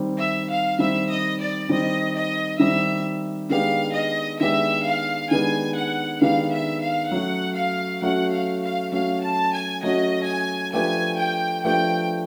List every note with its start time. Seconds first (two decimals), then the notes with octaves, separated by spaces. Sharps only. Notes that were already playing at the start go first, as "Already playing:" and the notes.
Already playing: D#3 G3 C4
0.18 E5
0.49 F5
0.79 D#3 G3 C4 E5
1.09 D#5
1.39 D5
1.69 D#3 G3 C4 D#5
2.14 D#5
2.59 D#3 G3 C4 E5
3.50 D#3 G#3 B3 D4 G4 F5
3.95 D#5
4.40 D#3 G#3 B3 D4 G4 E5
4.86 F5
5.31 D#3 G#3 B3 D4 G4 G#5
5.76 F#5
6.21 D#3 G#3 B3 D4 G4 F5
6.52 E5
6.82 F5
7.11 F#3 A3 C#4 F#4 F#5
7.56 F5
8.02 F#3 A3 C#4 F#4 F#5
8.32 F5
8.62 F5
8.92 F#3 A3 C#4 F#4 F5
9.23 A5
9.54 G#5
9.83 F#3 A3 C#4 F#4 D#5
10.28 G#5
10.73 F3 A3 D4 G4 B4 G#5
11.19 G5
11.64 F3 A3 D4 G4 B4 G5